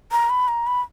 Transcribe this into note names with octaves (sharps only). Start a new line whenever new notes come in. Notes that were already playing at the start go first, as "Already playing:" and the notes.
A#5
B5
A#5
B5